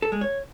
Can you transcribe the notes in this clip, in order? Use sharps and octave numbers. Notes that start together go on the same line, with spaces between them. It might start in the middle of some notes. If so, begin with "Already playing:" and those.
A4
G#3
C#5